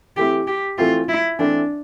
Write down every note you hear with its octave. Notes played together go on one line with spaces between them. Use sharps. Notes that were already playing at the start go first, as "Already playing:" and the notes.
E3 A3 C4 E4 G4
G4
E3 A3 C4 E4 F4
E4
E3 A3 C4 D4 E4